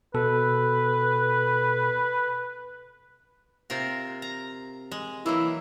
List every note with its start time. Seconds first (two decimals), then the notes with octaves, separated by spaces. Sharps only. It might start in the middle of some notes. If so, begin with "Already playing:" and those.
0.14 B2 A4 B4
3.70 C3 F4 A#4
4.22 A#5
4.91 G#3
5.26 E3 F#3 A#3 E4